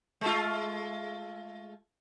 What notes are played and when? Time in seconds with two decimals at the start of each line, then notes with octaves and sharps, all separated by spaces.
0.21 G#3 A3 F4